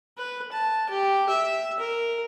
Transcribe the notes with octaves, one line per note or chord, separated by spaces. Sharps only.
B4
A5
G4
E5
A#4